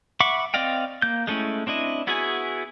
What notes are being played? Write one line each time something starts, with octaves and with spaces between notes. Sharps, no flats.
E5 F#5 B5 C#6 D6
C4 D5 D#5 F5 G5
A#3 G6
G#3 A3 C#4 E4
C4 D4 E4 D#5
B3 E4 F#4 G#4 G#5